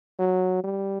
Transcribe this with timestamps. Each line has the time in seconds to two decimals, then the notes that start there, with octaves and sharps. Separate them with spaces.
0.19 F#3
0.64 G3